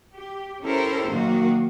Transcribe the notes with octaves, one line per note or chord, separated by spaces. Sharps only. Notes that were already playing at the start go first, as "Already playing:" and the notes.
G4
C#4 E4 G4 A4 A#4 C5
A#2 D#3 F#3 A#3 F#4